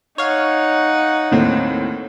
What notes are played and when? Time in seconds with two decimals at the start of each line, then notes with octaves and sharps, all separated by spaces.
0.18 D#4 C#5 F5 F#5
1.31 D#2 A2 C4